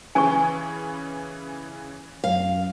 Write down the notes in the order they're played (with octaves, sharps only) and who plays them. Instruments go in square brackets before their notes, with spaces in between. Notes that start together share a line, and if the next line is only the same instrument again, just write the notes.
[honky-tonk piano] C#3 E3 C#4 [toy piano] G#5 C#6
[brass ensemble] F#2 [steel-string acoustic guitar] F5